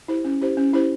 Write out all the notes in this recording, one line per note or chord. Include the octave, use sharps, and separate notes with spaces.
E4 G4 C5
C#4
E4 G4 C5
C#4
E4 G4 C5